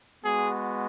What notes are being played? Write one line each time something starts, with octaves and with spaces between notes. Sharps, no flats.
G#3 B3 F#4 G#4